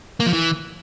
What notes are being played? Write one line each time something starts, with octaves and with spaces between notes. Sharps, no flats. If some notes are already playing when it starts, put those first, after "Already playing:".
A#3
F3
E3